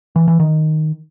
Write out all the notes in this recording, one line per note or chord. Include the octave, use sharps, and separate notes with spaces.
E3
E3
D#3